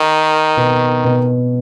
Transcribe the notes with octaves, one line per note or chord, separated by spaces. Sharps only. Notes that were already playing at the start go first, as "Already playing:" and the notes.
Already playing: D#3
B2 B3
B2 B3